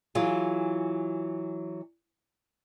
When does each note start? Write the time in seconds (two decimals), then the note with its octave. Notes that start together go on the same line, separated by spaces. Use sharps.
0.15 E3 F#3 F4 G#4